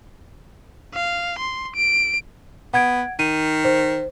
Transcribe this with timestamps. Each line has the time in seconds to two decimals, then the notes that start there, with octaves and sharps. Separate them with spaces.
0.94 F5
1.38 C6
1.75 D7
2.74 B3 F#5 G#6 D7
3.19 D#3 D#7
3.65 C5